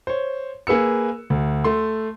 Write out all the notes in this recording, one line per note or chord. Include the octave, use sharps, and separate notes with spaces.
C5 C#5
A#3 G#4 B4 E6 C#7
D2
A3 C6